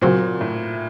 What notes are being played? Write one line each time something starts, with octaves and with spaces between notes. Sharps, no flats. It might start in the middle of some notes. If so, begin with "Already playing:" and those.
A#2 C#3 F#3 C4 F#4 C5
A2